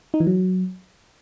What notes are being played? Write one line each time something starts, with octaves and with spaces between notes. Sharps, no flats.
D#4
E3
F#3